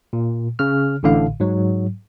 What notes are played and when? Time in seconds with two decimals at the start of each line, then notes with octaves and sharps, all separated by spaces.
0.13 A#2
0.59 C#3 F6
1.03 A1 A2 D3 F5
1.40 G#2 F#3